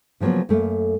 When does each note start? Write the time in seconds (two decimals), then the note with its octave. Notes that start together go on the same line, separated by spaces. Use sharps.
0.20 C#3 F3 F#3 A#3 B3
0.49 F#2 A3 A#3